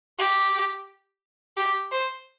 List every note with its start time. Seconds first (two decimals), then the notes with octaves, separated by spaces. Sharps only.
0.18 G4
1.57 G4
1.91 C5